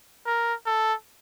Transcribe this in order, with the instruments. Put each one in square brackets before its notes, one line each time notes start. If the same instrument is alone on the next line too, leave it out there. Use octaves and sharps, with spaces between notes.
[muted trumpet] A#4
A4